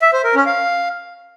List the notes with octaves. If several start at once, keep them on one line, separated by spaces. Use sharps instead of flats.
E5
C5
A#4
C#4
F5